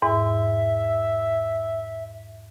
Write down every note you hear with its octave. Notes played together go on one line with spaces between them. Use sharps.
E2 G#2 E5